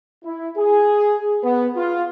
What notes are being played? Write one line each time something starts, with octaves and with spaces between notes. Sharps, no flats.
E4
G#4
B3
F4